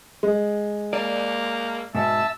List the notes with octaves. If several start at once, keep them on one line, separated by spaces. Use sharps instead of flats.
G#3
A#3 D5
G#2 B2 E5 A5 E6